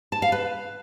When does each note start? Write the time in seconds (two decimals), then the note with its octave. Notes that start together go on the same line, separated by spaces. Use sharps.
0.12 A5
0.22 F5
0.32 B4